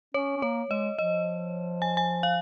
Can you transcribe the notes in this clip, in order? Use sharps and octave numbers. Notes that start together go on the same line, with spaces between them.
C#4 C#5
C#4
A#3 C#5
G#3 D#5
F3 D#5
G#5
G#5
F5